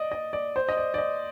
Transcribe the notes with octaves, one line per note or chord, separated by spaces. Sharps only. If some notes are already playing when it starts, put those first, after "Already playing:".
Already playing: D5 D#5
D#5
D5
C5
D#5
D5
D5
D#5